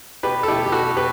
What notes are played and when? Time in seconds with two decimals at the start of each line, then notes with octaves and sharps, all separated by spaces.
0.23 B2 G4 B4
0.43 A4
0.48 B2 E4 G4
0.66 G4
0.72 B2 F#4 A4
0.96 B2 G4 B4